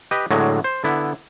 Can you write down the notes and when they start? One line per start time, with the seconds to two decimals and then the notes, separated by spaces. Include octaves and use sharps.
0.11 G4 B4 D#5
0.31 A2 D3 F#3 G#3
0.64 C5
0.84 D3 B3 E4